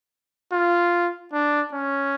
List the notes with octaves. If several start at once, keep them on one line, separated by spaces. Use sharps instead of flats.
F4
D4
C#4